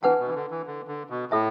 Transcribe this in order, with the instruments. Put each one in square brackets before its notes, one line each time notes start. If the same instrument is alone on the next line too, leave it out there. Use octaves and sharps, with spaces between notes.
[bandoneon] E3 [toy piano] D4 B4 F#5 A5
[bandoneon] B2
E3
D3
E3
D3
D3
B2
[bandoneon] A2 [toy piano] A4 E5 A5